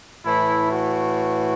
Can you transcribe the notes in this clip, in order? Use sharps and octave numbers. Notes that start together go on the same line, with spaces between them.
A2 E3 E4
F#4